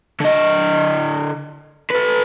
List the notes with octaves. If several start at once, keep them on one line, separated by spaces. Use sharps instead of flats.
D3 D#5
A4 B4